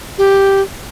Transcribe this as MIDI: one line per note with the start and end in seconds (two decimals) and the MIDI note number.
0.18 0.61 67